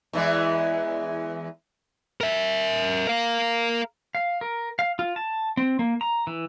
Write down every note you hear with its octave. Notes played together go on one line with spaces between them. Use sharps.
E2 E3 G#3
A#4 E5
A#4 F5
F5
A#4
F5
F4
A5
C4
A#3
A#5
E3